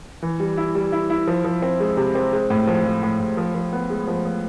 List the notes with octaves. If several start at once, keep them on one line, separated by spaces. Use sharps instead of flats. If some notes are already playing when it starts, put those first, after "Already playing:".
E3
G3
E4
G3
E4
E4
F3
F3
C4
G#3
C3
C4
G#3
A2
F3
F3
A2
A2
F3
F3
B3
G#3
F3
F3